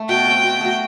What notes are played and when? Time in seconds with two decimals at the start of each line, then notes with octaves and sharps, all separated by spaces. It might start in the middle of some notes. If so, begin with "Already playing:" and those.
Already playing: A3
0.09 B2 G5
0.27 A3 C4
0.43 B2
0.61 F#3 A3